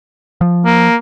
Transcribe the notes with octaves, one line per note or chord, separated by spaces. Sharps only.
F3
A#3